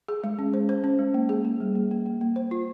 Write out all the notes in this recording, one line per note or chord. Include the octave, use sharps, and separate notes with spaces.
G#4
G#3
C#4
C5
C5
C#4
G#3
A#3
G#4
A#3
G3
A#3
A#3
A#3
A#3
C5
F4